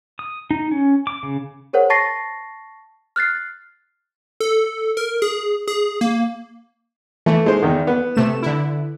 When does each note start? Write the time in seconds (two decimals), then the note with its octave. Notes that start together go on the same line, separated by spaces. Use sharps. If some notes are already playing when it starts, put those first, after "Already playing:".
0.19 D#6
0.51 D#4
0.71 C#4
1.07 D6
1.23 C#3
1.73 G#4 A#4 C5 C#5 F#5
1.90 A5 C#6 A6 A#6 C7
3.16 F6 F#6 A6 C7
4.40 A4
4.97 A#4
5.22 G#4
5.68 G#4
6.01 A#3
7.26 E3 A3
7.46 G#3 D#4 C5
7.63 E2 D#3
7.87 B3
8.15 C3 A3 E7
8.42 D3 E4